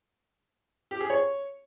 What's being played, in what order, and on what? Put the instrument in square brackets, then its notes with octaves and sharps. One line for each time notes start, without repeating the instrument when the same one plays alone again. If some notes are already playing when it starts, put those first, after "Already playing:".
[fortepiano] G4
G#4
C#5